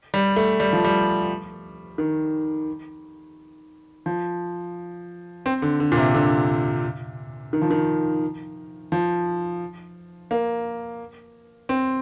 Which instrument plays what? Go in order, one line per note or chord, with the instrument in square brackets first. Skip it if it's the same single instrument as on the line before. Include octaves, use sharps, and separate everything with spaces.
[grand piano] G3
A3
G3
F3
G3
D#3
F3
C4
D3
D3
A#2
C3
D3
D#3
F3
D#3
F3
A#3
C4